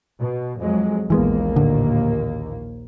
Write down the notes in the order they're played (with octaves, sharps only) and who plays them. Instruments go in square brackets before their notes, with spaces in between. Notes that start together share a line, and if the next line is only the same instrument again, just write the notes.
[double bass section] B2
F2 F#3 G#3
[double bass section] A#1 D#2 A#3 [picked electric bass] E3 G#3 B3
[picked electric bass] A2 D3